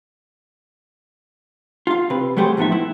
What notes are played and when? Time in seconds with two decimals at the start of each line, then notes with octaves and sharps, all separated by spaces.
1.87 F4 F5
2.10 C3 B4
2.37 F#3 G3 A3 G4 G#4 C5
2.57 A2 F3 B3 D#4 E5
2.72 E4